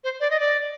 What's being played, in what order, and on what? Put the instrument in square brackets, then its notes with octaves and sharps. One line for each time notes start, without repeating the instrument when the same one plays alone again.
[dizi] C5
D5
D#5
D5